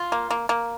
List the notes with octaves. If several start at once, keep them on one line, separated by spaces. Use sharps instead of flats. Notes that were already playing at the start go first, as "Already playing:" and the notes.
Already playing: F4
A#3
A#3
A#3